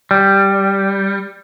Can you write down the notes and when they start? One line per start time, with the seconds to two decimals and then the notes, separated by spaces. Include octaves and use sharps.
0.11 G3